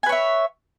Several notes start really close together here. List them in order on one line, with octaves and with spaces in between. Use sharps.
G#5 B4 C#5 E5